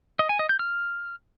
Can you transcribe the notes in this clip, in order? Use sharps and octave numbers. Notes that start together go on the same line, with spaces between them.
D#5
G#5
D#5
G6
F6